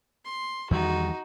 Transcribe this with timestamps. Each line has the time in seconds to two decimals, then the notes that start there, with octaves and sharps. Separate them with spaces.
0.25 C6
0.71 E2 D#3 G3 D#4 F#4